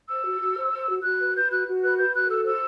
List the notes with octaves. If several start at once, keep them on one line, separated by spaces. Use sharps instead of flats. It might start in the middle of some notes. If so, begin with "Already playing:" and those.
C5 E6
F#4
F#4
C5
C5
F#4
F#4 F#6
B4
B4 G6
F#4 F#6
F#4
B4 F#6
B4 G6
F#4 F#6
A4 E6
C5 E6